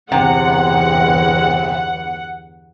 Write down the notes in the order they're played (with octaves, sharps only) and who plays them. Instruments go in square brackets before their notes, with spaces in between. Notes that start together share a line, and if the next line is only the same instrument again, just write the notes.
[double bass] G1 E2 [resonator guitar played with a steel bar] C3 [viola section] F#5